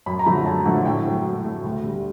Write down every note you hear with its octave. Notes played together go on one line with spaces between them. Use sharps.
F#2 B5
A#5
D3 F3 A3 B5
F#2 A5
D3 F3 A3
A2 G5
F#3 A3
A2
F#3 A3
D2
D3 G3